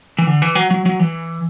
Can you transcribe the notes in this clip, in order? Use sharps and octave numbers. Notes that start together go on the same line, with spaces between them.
E3
D3
E3
F#3
F#3
F#3
E3